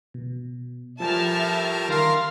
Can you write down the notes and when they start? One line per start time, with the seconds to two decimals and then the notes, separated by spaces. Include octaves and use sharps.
0.14 B2
1.00 A2 F3 G3 A#4 E5 G#5 A5 F6
1.89 D#3 A#4 F5 C6